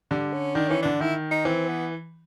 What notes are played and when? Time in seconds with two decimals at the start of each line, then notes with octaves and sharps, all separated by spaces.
0.11 D3 G3
0.33 C#4
0.55 D#3 D4
0.68 E3 C#4
0.82 D3 D4
1.00 D#3 E4
1.31 D#4
1.45 E3 C4
1.68 B3